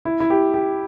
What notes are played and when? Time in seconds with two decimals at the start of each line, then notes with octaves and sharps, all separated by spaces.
0.05 E4
0.20 E4
0.30 G4
0.54 G4